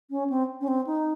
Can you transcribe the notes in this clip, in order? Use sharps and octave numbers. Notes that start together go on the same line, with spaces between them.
C#4
C4
C#4
C4
D#4